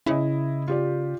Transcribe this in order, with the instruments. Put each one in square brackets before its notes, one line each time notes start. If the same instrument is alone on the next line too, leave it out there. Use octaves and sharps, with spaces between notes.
[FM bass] C#3 [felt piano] E4 D#5
[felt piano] F4 G4 D5